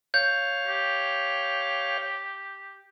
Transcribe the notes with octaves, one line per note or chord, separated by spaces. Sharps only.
C#5 F5 G6
G4